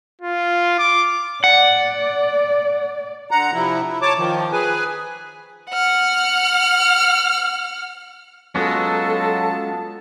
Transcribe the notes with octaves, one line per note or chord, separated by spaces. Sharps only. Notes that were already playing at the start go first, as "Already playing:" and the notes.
F4
D6
D5 F#5
D3 F#5 A#5
C3 F3 E4
E4
C#5 A5 D6
D#3 F3
G#4 B4 G#5
F#5 F6
F#3 G#3 B3 C#4 F4 A4 A5